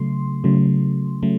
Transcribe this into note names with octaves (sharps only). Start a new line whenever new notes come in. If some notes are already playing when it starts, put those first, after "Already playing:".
Already playing: C#3 F#3 A3 C6
C#3 F#3 A3
C#3 F#3 A3